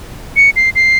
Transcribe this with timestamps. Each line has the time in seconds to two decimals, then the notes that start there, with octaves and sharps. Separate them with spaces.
0.36 C#7
0.56 C7
0.75 C7